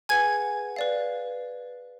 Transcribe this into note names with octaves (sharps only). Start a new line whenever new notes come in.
G#4 B4 F#5 G#5 G#6
B4 D5 F5